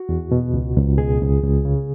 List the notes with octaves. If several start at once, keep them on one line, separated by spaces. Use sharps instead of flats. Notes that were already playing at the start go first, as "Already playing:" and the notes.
Already playing: F#4
E2
B2
C#2
C#2
B2 G#4
C#2
C#2
C#3